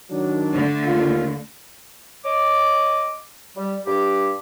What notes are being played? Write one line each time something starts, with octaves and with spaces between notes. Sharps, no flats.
D#3 F#3 D4
D3 A3
D#2 F4
C#5 D#5 D6
G3
G2 G4